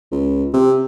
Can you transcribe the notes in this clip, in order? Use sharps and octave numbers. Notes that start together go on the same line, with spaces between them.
C#2
C3